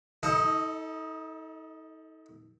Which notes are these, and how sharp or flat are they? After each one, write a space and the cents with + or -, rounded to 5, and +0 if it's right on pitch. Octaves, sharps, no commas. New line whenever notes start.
D#4 +40 A4 +0 D#5 +0